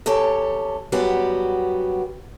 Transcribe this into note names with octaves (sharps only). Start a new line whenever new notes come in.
E2 G4 A4 C#5
F#2 G3 B3 F#4 G4